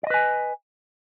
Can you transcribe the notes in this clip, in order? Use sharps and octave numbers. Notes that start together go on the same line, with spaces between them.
B4 D5 D#5 G#5